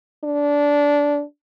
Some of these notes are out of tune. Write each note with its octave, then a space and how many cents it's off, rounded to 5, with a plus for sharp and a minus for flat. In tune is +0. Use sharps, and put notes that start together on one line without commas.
D4 -15